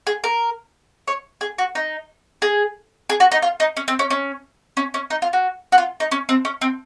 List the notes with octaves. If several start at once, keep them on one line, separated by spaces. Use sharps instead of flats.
G#4
A#4
C#5
G#4
F#4
D#4
G#4
G#4
F#4
D#4
F4
D#4
C#4
C4
C#4
C#4
C#4
C#4
D#4
F4
F#4
F#4
F4
D#4
C#4
C4
C#4
C4